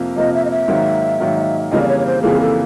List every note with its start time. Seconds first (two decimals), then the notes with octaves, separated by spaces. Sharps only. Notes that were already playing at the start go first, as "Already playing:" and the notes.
Already playing: F2 C3 F3 A#3
0.16 F2 C3 F3 A#3 D#5
0.34 E5
0.45 D#5
0.51 E5
0.68 G#2 D#3 F#3 A#3
1.20 G#2 D#3 F#3 A#3
1.71 F2 C#3 E3 G3 A#3 D#5
1.81 D5
1.88 C#5
1.99 C#5
2.06 C5
2.22 F2 C#3 E3 G3 A#3 G#4
2.40 A4